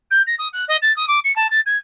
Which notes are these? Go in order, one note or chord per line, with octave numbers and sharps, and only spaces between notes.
G6
A#6
D#6
F#6
D#5
A6
D#6
D6
C#7
A5
A6
G#6